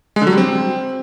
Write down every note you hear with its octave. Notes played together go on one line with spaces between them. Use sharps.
G#3
D3
F#3
G3
C4